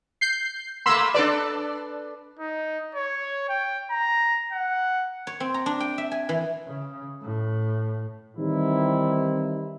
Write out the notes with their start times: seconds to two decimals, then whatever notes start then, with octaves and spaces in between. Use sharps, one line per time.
0.21 G6 C7
0.86 A3 A#3 B5 C6 E6
1.14 D4 A4 B4 D5
2.39 D#4
2.95 C#5
3.49 G5
3.91 A#5
4.52 F#5
5.27 C#5
5.40 C4
5.54 A#5
5.66 D4
5.80 G5
5.98 E5
6.11 G#5
6.29 E3
6.67 C#3
7.22 A2
8.37 D#3 E3 G3 C4 D#4 E4